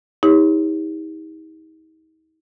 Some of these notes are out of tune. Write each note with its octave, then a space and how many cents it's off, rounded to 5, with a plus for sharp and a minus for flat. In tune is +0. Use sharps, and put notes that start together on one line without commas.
D#4 +40 G4 +40 C#5 -5